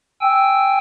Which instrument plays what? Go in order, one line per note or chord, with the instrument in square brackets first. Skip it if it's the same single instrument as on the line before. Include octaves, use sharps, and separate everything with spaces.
[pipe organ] G5 G#5 E6